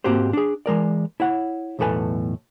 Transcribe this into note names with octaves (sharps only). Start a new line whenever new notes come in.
G#2 A#3 C4 F#4 G4 C5
D4 G#4
E3 G#3 A#4 D5
E4 C#5 F#5
B1 E2 A2 A4 B4 G#5